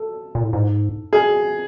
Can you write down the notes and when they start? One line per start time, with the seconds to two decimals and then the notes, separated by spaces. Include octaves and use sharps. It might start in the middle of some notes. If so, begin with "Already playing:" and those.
Already playing: A4
0.35 A#2
0.44 A2
0.53 G#2
1.13 G#4